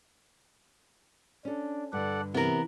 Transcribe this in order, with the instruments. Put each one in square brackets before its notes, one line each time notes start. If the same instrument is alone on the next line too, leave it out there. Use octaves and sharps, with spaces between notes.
[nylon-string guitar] C#4 A4 [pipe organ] D4
[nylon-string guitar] G2 D3 [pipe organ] A4 D5 F#5
[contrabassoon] C3 [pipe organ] E3 [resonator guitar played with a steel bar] B3 A#4